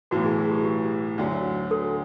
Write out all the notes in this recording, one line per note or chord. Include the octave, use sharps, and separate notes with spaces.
B1 A2 E3 F#4
G#4
G#4
G4
G4
D2 D3 F#3
A4